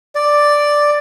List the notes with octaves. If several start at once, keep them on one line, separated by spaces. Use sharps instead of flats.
D5